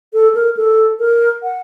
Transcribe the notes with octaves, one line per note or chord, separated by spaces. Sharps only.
A4
A#4
A4
A#4
F#5